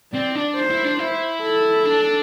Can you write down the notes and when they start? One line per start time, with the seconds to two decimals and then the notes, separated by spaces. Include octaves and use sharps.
0.13 C4 D5
0.35 D4
0.57 C5
0.70 E4
0.84 D4
0.99 E4
1.43 A4
1.85 D4